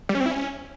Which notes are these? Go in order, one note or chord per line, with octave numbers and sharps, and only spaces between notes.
G3
C#4
C4
E4
C#4